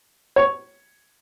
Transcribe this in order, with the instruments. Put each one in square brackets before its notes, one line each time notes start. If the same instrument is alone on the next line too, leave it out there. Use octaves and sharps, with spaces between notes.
[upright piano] C#5